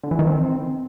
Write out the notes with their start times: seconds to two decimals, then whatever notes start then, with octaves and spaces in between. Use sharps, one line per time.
0.03 D3
0.11 E3
0.19 D#3
0.27 C4